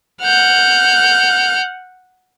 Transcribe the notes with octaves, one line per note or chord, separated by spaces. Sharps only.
F#5 F6 G6